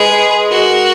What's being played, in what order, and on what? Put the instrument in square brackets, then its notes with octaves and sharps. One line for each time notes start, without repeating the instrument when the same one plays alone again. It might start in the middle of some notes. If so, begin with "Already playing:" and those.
Already playing: [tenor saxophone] G#3 [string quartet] G#4 B4
[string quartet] F#4 A#4